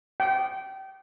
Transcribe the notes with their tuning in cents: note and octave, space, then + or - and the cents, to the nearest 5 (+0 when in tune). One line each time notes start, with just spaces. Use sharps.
G5 -30